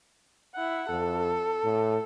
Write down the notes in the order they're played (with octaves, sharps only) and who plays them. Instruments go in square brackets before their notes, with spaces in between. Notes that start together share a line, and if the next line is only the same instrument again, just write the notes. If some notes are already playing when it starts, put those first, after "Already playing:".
[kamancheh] E4 F#5
[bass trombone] F2 [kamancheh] A4
[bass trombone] A2